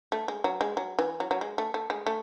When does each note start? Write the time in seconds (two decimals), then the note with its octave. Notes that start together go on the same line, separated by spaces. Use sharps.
0.12 A3
0.28 G#3
0.44 F#3
0.61 G#3
0.77 F#3
0.99 E3
1.20 F#3
1.31 F#3
1.41 G#3
1.58 A3
1.74 A3
1.90 G#3
2.06 A3